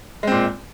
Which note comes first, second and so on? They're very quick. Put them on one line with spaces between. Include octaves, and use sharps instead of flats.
G#3 C4 A#2